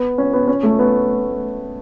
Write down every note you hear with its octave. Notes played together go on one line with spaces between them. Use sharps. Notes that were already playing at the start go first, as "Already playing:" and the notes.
Already playing: B3
C#4
B3
C#4
A3
B3